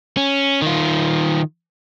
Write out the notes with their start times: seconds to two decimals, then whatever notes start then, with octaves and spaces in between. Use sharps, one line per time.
0.17 C#4
0.62 D#3 F4